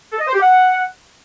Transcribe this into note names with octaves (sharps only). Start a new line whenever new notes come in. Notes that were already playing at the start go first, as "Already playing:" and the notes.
A4
D#5
C5
G4
F#5